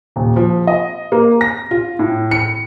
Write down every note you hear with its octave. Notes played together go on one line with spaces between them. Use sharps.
D#1
F3
D#5
A#3
A#6
F4
A2
C#7